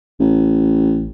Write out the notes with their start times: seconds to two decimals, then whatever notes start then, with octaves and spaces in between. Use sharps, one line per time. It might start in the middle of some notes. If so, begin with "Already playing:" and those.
0.20 A1